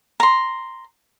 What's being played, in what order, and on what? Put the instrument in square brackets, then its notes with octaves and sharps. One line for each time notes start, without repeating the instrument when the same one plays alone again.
[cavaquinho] A#5 C6